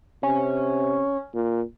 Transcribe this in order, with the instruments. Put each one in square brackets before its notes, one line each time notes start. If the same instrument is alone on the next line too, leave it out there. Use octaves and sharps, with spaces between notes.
[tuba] C3 [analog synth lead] C#4
[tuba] A#2